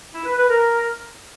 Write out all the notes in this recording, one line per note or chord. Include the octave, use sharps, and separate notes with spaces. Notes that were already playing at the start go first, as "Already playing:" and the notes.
E4
B4
B4
A#4